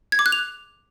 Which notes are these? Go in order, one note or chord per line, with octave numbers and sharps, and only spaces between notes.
G#6
D6
F#6
F7